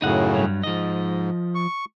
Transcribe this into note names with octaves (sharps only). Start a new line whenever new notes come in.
F#2 A2 C#3 D#4 F#5
G2 F#3
G#2 F3 D#5
C#6